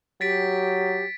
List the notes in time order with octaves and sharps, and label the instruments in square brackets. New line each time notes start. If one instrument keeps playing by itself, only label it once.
[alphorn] F#3 [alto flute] G4 [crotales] A6 B6 D7